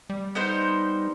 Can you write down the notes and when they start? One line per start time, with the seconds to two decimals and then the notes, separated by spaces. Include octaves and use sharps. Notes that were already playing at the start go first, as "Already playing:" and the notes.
0.10 G3
0.35 B3 D#4 C5